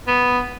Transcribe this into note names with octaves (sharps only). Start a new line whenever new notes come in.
B3